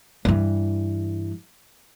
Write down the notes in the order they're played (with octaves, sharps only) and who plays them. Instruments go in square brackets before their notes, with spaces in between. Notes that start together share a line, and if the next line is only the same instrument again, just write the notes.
[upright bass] G2 E3